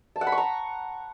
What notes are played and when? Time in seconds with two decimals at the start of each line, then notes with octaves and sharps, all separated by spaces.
0.16 A5
0.21 F#5
0.27 B5
0.32 C#6
0.38 A#5